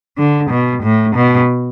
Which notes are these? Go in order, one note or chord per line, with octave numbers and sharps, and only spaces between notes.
D3
B2
A2
B2